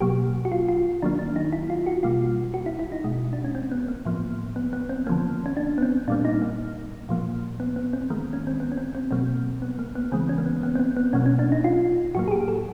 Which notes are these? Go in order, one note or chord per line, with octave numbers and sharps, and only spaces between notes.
B2 F#3 A#3 G4
F#4
F4
F4
D#3 F#3 A#3 D4
D4
D#4
E4
F4
F#4
B2 G3 A#3 F4
F#4
E4
E4
D#4
B2 G#3
D4
C#4
C4
B3
A#3
A2 F3 A#3
B3
B3
C4
D3 F3 A#3 C#4
C#4
D4
B3
C4
A#2 G3 A#3 D4
D#4
A#3
A#2 F3 A#3
B3
B3
C4
D#3 G#3 A#3
C#4
C4
B3
C#4
C4
C4
B2 F#3 A#3 C4
B3
A#3
B3
C#3 E3 G#3 C4
C#4
A#3
B3
B3
C4
B3
B3
B2 F#3 A#3 C#4
C#4
D4
D#4
F4
A2 F#3 A#3 F#4
G#4
G4
A4